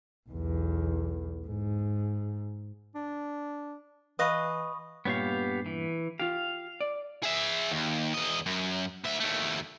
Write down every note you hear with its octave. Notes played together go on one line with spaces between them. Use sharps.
B1 E2
G#2
D4
E3 B4 D#5 F5 B5 C#6 D#6
G2 A#2 B3 G4 C#5 F5
E3
F4 G4 F5
D5
G#4 E5
D#2
E2 D#5
F#2
D2 E5
D#2 A3